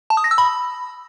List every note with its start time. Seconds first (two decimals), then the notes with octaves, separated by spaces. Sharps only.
0.10 A5
0.17 D#6
0.24 A#6
0.31 E6
0.38 B5